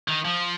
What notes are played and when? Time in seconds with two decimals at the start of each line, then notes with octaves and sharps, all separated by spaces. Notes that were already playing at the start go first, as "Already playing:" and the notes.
0.08 D#3
0.25 F3